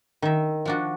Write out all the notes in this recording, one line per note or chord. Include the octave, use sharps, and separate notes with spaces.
D#3 E5
F3 D4 F#4